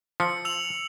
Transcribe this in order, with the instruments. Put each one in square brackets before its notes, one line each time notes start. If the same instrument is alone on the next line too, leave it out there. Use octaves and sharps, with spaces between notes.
[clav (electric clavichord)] F3 [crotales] E6 C#7
[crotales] E6 F7 F#7